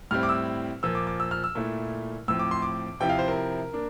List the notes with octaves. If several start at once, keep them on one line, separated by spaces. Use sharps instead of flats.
A2 G3 C4 E4 F6
D6
E6
A#2 F3 A#3 E6
D6
D6
E6
F6
E6
A#2 A3 E4
A2 F3 C4 E6
D6
C6
D6
C3 F3 C4 E4 G5
F5
C5
A#4
A#3 D4